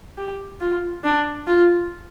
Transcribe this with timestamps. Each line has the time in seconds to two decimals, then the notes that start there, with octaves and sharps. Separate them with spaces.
0.17 G4
0.60 F4
1.04 D4
1.47 F4